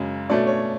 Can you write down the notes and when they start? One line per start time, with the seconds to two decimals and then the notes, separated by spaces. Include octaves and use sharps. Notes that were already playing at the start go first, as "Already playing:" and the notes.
Already playing: F#2 C#3 G#3
0.30 B2 A3 C#4 D5
0.47 C#5